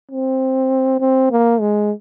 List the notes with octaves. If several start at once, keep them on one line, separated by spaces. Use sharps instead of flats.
C4
C4
A#3
G#3